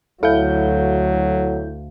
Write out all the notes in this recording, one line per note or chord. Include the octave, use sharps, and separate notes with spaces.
D2 F#3 E4 A4 F5 G6